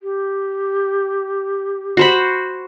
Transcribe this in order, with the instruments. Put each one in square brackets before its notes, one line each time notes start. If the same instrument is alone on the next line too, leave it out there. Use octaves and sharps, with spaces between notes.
[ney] G4
[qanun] F#4 C5 B5